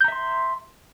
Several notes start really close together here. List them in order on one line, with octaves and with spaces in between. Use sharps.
G6 A#5 E5 C6